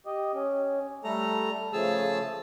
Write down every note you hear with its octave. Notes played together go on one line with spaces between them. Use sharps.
G4 D#5
C#4
G3 A3 A4 A#5
C#3 F3 A3 G#4 A5 E6